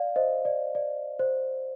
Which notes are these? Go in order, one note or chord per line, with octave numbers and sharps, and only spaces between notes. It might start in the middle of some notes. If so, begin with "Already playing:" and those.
Already playing: D5 F5
C5 D#5
D5
D5
C5